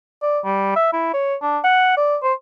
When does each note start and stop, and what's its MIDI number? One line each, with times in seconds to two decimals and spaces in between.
0.22 0.39 74
0.45 0.74 55
0.76 0.91 76
0.93 1.11 64
1.14 1.35 73
1.42 1.59 62
1.64 1.94 78
1.97 2.16 74
2.23 2.33 72